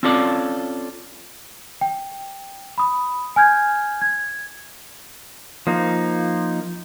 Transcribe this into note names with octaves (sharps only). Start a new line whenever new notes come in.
C4 C#4 F4 A4 D5
G5
B5 D#6
G#5 F6 G6 G#6
G#6
F3 A#3 D#4